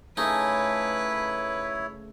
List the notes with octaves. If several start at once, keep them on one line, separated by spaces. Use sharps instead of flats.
C#3 A3 D#4 E4 B4 C#5